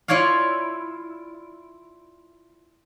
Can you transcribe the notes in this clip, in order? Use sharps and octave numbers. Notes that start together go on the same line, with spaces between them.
E4 F4 C#5 D5 F5